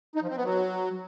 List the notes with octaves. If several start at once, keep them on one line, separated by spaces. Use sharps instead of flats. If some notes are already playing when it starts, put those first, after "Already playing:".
D#4
F3
C4
B3
F#3